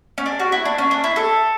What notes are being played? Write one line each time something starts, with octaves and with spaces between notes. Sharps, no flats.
C#4
D4
F#4
E4
D4
C#4
D4
E4
A4